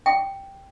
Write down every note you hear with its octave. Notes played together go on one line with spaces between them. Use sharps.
G5